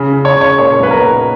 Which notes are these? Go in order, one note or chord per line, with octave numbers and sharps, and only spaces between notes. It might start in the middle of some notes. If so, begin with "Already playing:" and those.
Already playing: C#3
C#3
C#5
C#3
C#5
A#2 C#5
B1 B4
A#4
A#2